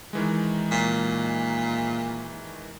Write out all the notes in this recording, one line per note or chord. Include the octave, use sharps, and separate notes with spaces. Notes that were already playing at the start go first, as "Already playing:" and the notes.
D#3 E3 G#3
A#2